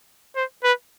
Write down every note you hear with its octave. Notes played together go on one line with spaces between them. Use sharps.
C5
B4